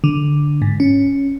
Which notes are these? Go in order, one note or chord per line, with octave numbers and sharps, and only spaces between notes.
D3
G#2
C#4